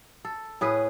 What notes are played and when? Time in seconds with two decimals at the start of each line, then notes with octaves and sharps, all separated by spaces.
0.25 A4
0.61 A2 G#4 B4